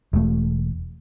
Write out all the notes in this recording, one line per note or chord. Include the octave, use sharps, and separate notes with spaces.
E1 A3